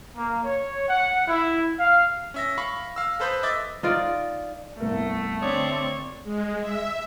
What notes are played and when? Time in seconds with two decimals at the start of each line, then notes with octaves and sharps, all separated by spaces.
0.15 A#3
0.44 C#5
0.88 F#5
1.28 E4
1.80 F5
2.34 C#4 E5 A#6
2.58 F5 B5 C#6
2.96 F5 E6
3.20 A4 B4 C5 B5 D#6 G6
3.43 D#5 E5 D6 A6
3.83 D#4 F4 D5
4.80 G1 C2 A3 A#4
5.42 D3 C4 C#5 D5 D#6
6.24 G#3
6.60 E5